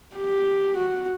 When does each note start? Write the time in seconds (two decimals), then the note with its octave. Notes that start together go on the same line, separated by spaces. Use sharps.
0.16 G4
0.76 F#4